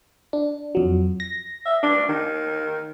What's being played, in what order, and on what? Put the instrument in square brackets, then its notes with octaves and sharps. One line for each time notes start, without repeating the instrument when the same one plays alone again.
[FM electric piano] D4
F2 F#3
A#6
[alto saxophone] E5
D4
D#3